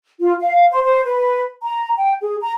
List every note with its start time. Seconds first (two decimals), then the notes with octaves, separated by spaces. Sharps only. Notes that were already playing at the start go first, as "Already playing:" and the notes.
0.21 F4
0.40 F5
0.71 C5
0.84 C5
1.05 B4
1.63 A#5
1.97 G5
2.22 G#4
2.41 A#5